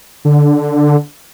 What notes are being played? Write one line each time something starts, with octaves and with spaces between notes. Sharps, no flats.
D3